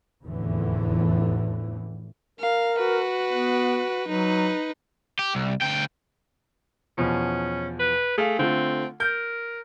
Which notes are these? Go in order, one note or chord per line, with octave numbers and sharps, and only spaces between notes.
F1 E2 A2 D3 E3
A#4 F5
F#4 B4
B3
F#3 D#4 B4
G4
C2
D2 G5
E2 B2 F3 C#4
B4
A3 G#4 F5
D3 A3 C4 F4
A#4 G6